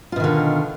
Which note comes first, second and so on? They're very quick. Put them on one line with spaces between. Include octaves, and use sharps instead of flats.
F4 B2 D#3 D3